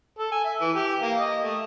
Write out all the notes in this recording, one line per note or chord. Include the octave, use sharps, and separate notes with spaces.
A4
G#5
E5
E3
G4
A#3
D#5
A3